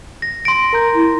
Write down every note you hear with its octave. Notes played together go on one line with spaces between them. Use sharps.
A#6
C6 A#6 D7
A#4 A#5 G6
E4